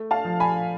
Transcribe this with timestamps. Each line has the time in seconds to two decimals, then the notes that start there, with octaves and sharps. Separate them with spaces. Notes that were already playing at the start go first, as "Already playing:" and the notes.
Already playing: A3
0.11 F5 A5
0.25 F3
0.40 G#5 B5